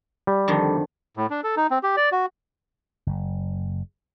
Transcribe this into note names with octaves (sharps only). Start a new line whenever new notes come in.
G3
F2 D3 D#3
A2
D4
A4
D#4
C4
G4
D5
F#4
F#1